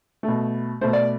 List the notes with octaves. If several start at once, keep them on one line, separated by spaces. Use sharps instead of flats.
A3
B2
B2 A3 C5
D5